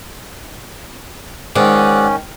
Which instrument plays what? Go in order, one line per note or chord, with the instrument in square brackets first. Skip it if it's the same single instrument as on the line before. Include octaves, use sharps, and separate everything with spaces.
[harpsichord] G#2 [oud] D#3 [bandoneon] C#4 [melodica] D5 F#5